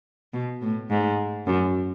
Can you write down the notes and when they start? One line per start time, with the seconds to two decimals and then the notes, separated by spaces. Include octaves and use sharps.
0.33 B2
0.62 A2
0.90 G#2
1.47 F#2